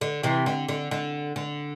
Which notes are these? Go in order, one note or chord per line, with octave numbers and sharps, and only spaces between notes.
D3
C3 E3
D3
D3
D3
D3